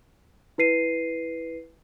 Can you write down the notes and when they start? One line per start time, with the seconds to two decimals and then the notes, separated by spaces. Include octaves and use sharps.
0.58 E4 B4 C7 D#7